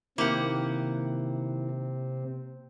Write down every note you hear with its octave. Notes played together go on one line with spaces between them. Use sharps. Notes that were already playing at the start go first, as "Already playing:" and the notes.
C3 D#3 A#3 C4 E4 G4 F#5